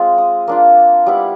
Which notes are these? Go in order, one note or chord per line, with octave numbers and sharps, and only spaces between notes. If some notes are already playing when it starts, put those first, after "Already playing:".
Already playing: G#3 C4 F4
D#6
A#3 D4 F4 D#6
G3 B3 E4